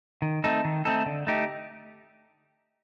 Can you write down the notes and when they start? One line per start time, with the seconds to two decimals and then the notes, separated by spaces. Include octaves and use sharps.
0.22 D#3
0.44 A3 C4 D#4 A4
0.65 D#3
0.85 A3 C4 D#4 A4
1.06 D3
1.27 A3 D#4 G4